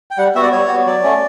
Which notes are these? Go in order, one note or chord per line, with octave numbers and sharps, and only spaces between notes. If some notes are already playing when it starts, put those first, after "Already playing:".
G5
G3 F#5
B3 F#4 E5
D5
G3 C#5
B3 F#4
F#3 D5
A3 C#4